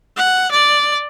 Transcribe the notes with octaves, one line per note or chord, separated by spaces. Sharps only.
F#5
D5